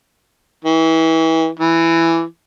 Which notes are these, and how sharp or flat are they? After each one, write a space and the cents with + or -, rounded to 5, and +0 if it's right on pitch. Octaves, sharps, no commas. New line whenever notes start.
E3 -30
E3 +10